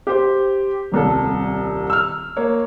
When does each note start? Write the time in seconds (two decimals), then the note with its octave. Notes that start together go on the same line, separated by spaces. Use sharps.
0.07 G4 C5
0.92 D#1 C2 A4
1.90 E6 F6
2.37 A#3 C#5